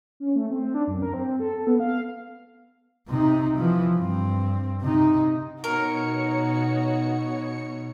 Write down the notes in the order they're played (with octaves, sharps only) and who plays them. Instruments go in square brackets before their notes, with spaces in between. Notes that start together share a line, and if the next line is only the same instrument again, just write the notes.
[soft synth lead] C#4
A3
C4
D4
F#2
A#4
C4
A4
A4
B3
F5
[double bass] C3 D#4
E3 F3
G2 C4
C3 D#4
[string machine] B2 C#5 C#7 [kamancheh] D#4 F#4 [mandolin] A#4